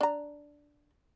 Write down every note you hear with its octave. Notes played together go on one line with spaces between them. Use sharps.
D4 A#5